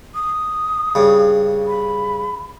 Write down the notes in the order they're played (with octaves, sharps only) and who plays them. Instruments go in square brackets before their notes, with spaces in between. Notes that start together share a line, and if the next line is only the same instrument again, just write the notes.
[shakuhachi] D#6
[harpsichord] G2 C#3
[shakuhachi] B5